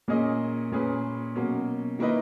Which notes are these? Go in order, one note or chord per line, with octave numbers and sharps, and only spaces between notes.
A#2 A#3 C#4 G#4 D#5
A#2 A#3 C#4 G#4 B4
B2 F#3 A#3 C#4
D#3 A#3 E4 B4 D#5